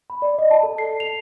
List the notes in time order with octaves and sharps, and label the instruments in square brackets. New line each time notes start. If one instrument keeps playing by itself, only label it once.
[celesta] B5
D5
D#5
A5
A4
C7
F7